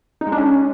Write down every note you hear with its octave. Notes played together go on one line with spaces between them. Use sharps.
D#4
G#3
D4
C#4